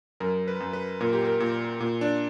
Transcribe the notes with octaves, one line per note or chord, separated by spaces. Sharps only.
F#2 A#4
B4
F#2
B4
A#2 A#4
G4
A#4
A#2
A#2
D4